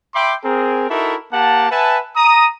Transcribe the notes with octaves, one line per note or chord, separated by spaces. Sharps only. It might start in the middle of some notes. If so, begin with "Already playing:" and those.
E5 G5 B5 C6 D6
C4 G#4 A#4
D#4 E4 F#4 A4 A#4 E5
A#3 G4 F#5 A5
B4 E5 F#5 G#5 A5
A#5 D#6